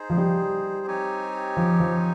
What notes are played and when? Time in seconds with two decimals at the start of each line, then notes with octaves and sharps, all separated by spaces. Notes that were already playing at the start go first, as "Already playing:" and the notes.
Already playing: D#4 G#4 C5
0.10 F3
0.17 G3
0.87 C4 D#4 G4 C#5 G#5
1.57 F3
1.80 F3